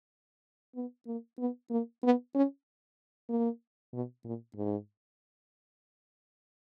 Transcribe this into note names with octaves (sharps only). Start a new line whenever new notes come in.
B3
A#3
B3
A#3
B3
C#4
A#3
B2
A#2
G#2